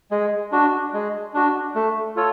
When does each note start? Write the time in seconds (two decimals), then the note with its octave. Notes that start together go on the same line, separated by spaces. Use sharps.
0.11 G#3
0.52 D4 F#4
0.94 G#3
1.34 D4 F#4
1.75 A3
2.16 F4 A4 C#5